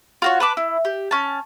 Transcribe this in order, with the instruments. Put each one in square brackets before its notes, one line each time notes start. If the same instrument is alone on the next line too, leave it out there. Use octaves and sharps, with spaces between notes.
[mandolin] F4 F#4 C#5
B4 A5 D6
E4
G4
C#4 A5